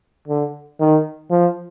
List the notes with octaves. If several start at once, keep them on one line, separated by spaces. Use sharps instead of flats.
D3
D#3
F3